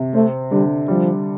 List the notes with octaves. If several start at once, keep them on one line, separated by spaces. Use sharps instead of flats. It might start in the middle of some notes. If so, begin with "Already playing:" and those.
Already playing: C3
A3 C4
D3 G3
F3 G3